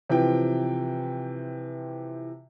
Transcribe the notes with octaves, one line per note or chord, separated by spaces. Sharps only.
C3 E3 F3 G5